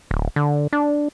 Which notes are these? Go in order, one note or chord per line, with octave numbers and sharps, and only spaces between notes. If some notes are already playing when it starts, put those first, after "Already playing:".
D1
D3
D4